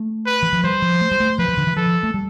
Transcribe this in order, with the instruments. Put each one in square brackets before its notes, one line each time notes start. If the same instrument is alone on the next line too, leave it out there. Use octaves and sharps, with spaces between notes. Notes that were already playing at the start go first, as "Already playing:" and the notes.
Already playing: [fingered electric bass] A3
[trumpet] B4
[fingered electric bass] E3
F3
[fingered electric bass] G3 [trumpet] C5
[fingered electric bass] F3
A3
G3
A3
[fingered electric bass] F3 [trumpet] B4
[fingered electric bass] F3
D3
E3
[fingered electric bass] F3 [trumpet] A4
[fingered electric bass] A3
G3